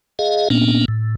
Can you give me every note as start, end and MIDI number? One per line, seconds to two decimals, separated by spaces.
0.19 0.49 68
0.19 0.49 75
0.19 0.49 77
0.50 0.85 46
0.50 0.85 58
0.50 0.85 59
0.50 0.85 61
0.50 0.85 62
0.88 1.15 45